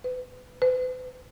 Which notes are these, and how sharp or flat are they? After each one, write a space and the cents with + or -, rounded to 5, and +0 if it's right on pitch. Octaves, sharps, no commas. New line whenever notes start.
B4 +30
B4 +45